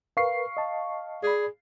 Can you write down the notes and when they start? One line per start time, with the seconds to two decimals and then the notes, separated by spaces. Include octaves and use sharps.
0.17 A#4 B4 F5 C#6 C7
0.57 D#5 A5
1.23 G#4 D5 B5